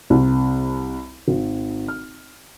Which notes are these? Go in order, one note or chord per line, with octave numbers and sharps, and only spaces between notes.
C2
G#1
F6